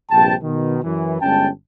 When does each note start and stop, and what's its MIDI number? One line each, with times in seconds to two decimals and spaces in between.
0.11 0.35 34
0.11 0.35 43
0.11 0.35 48
0.11 0.35 79
0.11 0.35 81
0.43 0.77 47
0.43 0.77 51
0.83 1.21 42
0.83 1.21 52
1.21 1.49 31
1.21 1.49 56
1.21 1.49 61
1.21 1.49 79
1.21 1.49 81